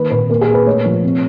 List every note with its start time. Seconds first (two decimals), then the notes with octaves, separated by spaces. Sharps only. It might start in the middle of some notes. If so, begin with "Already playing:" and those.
Already playing: D#3 A#3 B4
0.11 A#2 B4
0.29 A#3 A#4
0.41 G#4
0.49 A#3
0.54 B4
0.66 A3 C#5
0.86 F3
1.03 C3